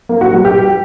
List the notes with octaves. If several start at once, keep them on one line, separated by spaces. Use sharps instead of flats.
A#3
F#4
G3
G4